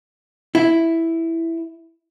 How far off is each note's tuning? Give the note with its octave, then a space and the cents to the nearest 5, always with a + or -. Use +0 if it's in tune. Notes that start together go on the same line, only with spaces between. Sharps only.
E4 +0